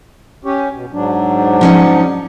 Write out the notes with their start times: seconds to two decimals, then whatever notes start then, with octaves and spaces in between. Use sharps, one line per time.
0.45 C#4 G4 C#5
0.73 B2
0.92 G#2 F#3 D4
1.61 F3 C#4 D#4